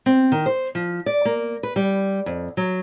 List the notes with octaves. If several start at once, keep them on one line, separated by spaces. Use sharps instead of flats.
C4
D#3
C5
F3
D5
A#3
B4
G3
F2
F#3